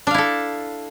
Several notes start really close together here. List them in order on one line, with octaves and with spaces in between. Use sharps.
D4 F5 E4 A4